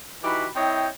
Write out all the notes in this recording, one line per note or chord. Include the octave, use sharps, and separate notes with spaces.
E3 D#4 F#4 G4 B5
C4 E4 C#5 D#5 G5